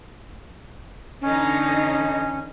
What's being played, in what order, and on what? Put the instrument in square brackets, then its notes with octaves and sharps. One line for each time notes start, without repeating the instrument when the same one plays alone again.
[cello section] D3 E3 D#4 [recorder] C#4